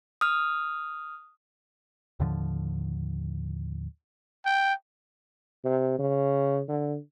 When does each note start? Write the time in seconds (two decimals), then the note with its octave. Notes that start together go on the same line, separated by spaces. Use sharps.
0.21 D#6 F6
2.20 D#2 A2 D3 F3
4.46 G5
5.65 C3
5.99 C#3
6.68 D3